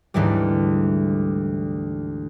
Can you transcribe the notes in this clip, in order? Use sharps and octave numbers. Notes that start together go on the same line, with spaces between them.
D2 G#2 E3 G3